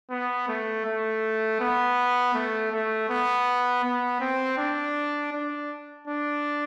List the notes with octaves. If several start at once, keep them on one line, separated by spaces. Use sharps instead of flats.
B3
A3
A3
B3
A3
A3
B3
B3
C4
D4
D4
D4